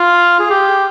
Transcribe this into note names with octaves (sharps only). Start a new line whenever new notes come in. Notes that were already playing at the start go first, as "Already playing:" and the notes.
Already playing: F4
G#4
G4